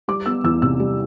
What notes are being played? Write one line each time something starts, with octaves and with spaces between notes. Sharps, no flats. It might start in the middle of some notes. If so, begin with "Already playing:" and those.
G3 D6
B3 E6
E2 E6
C3 E6
G3